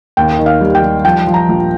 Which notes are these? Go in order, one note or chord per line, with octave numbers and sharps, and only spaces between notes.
D#2 G5
D#3
F5
G3
G5
G3
F3 G5
F3
A#5
A#1